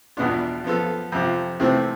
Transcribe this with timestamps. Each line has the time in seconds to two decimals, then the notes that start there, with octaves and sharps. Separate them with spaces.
0.17 E2 B2 B3 D4 F4
0.64 F3 B3 F4 A4
1.12 F2 C3 F3
1.60 C3 E3 A3 C4